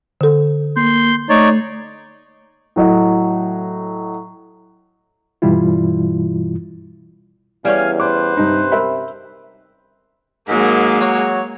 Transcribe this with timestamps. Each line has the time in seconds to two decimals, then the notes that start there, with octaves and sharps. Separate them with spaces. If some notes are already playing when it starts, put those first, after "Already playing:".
0.21 D3 A4
0.76 A#3 C6 G6
1.29 A3 D#4 C#5 D5
2.76 A2 F#3 D#5
5.42 G2 B2 E3 G3 E4 F4
7.65 E2 G3 C#4 F5 G#5 F6
8.00 B4 C5 D6
8.37 G2 C3 D#4
8.72 A#4 E5 B5
10.48 G#2 D#3 F#3 G#3 A#3
11.01 F#3 C#5